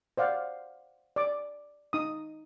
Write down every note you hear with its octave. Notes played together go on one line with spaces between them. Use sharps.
C5 D5 F5 F#5
D5 D6
D#4 D#6